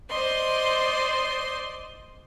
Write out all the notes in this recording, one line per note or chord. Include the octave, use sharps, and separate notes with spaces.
C5 D5 D#5 C6